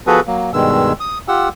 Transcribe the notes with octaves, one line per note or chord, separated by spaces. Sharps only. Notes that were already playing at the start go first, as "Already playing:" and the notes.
F3 B3 F#4 G#4 A4 B4
F#3 A#3
G2 B2 D#3 G#3 E6
D#6
F4 G4 F#5 E6